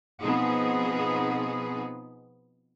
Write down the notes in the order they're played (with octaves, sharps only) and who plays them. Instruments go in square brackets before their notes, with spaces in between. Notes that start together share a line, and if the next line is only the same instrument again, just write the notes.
[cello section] B2 F3 B3 C4 D#4 G#4